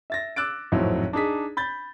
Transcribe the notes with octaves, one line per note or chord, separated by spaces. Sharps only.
E5 A6 A#6
D6 E6 F#6 A6 D7
G#1 F2 A2 F#3
D4 D#4 G#4 B6
B5 G6 A6